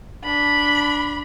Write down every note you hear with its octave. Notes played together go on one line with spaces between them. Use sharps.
D4 B5